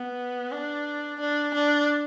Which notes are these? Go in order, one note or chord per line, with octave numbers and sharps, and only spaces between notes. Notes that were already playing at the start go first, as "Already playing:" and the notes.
Already playing: B3
D4
D4
D4